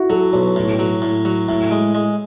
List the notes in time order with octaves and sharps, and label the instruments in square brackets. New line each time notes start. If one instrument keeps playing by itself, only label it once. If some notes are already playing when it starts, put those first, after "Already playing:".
Already playing: [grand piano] E4 F#4
[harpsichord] F#3 [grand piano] A4
[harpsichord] B1 [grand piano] C#5
[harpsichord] A2
F#3
A2
F#3
[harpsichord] A2 [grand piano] E5
[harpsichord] G#3
G#3